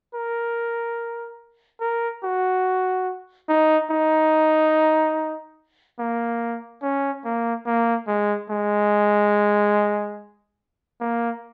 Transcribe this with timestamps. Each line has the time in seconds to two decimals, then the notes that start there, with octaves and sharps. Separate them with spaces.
0.14 A#4
1.80 A#4
2.23 F#4
3.49 D#4
3.90 D#4
5.99 A#3
6.82 C#4
7.25 A#3
7.66 A#3
8.07 G#3
8.50 G#3
11.01 A#3